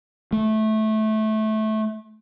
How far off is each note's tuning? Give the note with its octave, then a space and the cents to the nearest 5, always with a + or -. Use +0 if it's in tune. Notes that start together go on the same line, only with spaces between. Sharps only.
A3 -15